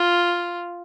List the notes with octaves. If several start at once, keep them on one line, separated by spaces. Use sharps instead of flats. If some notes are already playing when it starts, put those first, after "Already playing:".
Already playing: F4